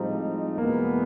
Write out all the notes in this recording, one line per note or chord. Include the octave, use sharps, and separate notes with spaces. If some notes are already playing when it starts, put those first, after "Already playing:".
Already playing: A2 F3 G3 G#3 C4 D#4
E2 B2 G#3 A#3 B3